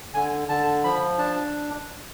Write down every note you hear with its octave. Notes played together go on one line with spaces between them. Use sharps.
D3 G#5
D3 A5
F3 B5
D4 A5